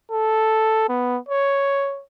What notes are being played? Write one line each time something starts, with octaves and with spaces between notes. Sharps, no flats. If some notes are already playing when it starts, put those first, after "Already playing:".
A4
B3
C#5